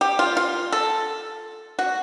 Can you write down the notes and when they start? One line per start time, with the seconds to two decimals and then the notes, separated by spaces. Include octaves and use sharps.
0.01 G4
0.19 F4
0.37 F4
0.72 A4
1.79 F#4